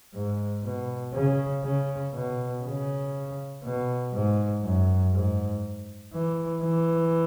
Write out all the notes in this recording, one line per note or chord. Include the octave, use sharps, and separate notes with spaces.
G#2
B2
C#3
C#3
B2
C#3
B2
G#2
F#2
G#2
E3
E3